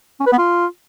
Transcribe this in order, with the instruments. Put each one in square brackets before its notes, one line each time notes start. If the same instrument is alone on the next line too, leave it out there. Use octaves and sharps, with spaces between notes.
[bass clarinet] C#4
B4
B3
F4